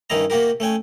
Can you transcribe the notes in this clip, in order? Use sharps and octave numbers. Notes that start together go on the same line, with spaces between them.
G2 D#3 C#4 E4 D#5 A#5
C3 A#3 F#4 G4 A#4
A3 C#4 G5 G#5